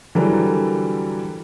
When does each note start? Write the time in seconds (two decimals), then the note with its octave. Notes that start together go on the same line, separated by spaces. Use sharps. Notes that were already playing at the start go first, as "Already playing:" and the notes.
0.15 D3 E3 F#3 G3 A4 A#4